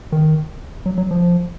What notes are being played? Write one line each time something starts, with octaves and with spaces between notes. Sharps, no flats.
D#3
F#3
F#3
F3